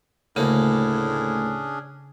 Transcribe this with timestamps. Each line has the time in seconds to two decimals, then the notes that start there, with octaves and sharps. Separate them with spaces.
0.36 D2 A2 C#3 A#3 C#4 D4 G#4